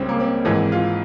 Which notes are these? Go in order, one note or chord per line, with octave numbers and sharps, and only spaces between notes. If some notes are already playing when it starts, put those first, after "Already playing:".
Already playing: C#2 C#3 G3 C4 C#4
A#3
C4
G#1 G#2 E3 C4
F4